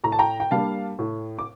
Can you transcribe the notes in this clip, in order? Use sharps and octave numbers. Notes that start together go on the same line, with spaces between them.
A2 A#5
A5
G5 A#5
G5
G3 A#3 D4 F5 A5
A2
D6